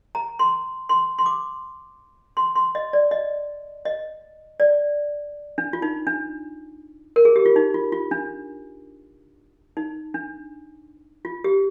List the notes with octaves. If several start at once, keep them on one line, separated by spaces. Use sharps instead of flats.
A#5
C6
C6
C6
D6
C6
C6
D#5
D5
D#5
D#5
D5
D4
F4
D#4
D4
A#4
G#4
G4
F4
D#4
F4
F4
D4
D#4
D4
F4
G4